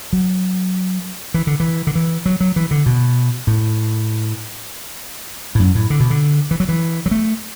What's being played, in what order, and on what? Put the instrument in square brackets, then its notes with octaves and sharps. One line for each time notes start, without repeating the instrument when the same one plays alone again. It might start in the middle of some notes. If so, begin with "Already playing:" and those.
[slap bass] F#3
E3
D3
E3
D3
E3
F#3
F#3
E3
D3
B2
A2
A2
F#2
A2
D3
B2
D3
E3
F#3
E3
F#3
A3